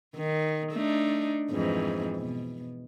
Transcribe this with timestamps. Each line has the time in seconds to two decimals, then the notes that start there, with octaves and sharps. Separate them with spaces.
0.16 D#3
0.72 A3 D4 D#4
1.51 F2 G#2 E3
2.18 B2